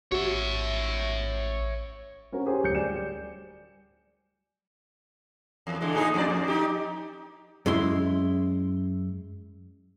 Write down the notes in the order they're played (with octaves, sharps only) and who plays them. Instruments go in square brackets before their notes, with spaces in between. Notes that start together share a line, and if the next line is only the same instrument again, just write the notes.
[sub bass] A1 [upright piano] F#4 [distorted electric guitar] C#5 E5
[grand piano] C4 C#4 F#4 A#4
G4 G#4 A#4 C5 C#5 G#5
D1 G6 C#7
F#3 D5 G#5 E7
G3
[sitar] E2
D3 E3 G#3
A2 D#4 G#4
F2 A#2 D5
F2
D#4 G4
[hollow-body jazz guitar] F#2 G#3 E4 C6